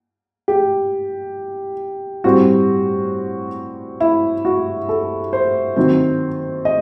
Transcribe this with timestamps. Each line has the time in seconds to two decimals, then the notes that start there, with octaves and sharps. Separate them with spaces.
0.48 G4
2.24 A2 G3 C4 F#4
4.00 E4
4.45 F#4
4.89 A4
5.33 C5
5.76 D#3 F#3 C4
6.65 D#5